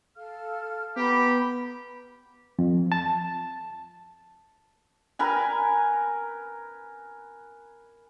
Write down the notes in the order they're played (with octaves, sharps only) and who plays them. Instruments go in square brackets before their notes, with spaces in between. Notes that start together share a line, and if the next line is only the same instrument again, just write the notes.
[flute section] A4 F5 F6
[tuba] B3 [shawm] G4 [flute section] A#5 B5
[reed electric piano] F2
A5
[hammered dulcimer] A#4 B4 G#5